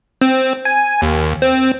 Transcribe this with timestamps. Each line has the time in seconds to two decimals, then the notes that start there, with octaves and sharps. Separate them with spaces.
0.22 C4
0.65 G#5
1.02 D#2
1.42 C4